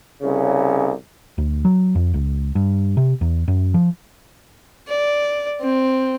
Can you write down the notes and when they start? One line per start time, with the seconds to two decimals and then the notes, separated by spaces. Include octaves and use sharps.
0.22 C2 C#3
1.38 D2
1.65 F#3
1.95 F2
2.14 C#2
2.55 G2
2.97 C3
3.21 E2
3.48 F#2
3.74 F3
4.87 D5
5.61 C4